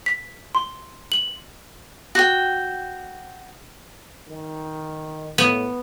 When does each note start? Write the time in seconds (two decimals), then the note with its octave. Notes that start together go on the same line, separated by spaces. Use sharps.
0.06 B6
0.55 C6
1.12 F#7
2.15 F#4 G5
4.29 D#3
5.38 A2 B3